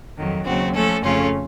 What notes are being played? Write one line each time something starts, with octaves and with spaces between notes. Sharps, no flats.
F2 D#3 F#3
D#2 C#3 F#3 C4 F#4
F3 A3 C#4 A4
F2 C#3 A3 C#4 F4